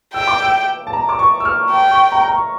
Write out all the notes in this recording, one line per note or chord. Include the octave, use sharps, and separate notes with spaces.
G5 E6
D6
E6
A5
A#5
D6
C#6
E6
F6
G5
C#6
A#5
A#5
C#6